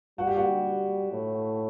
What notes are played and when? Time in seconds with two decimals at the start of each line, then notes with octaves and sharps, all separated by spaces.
0.18 G3 F#4
0.27 G4
0.36 F#4
1.11 A2